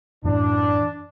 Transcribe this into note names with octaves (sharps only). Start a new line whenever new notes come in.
F#2 A2 E3 D4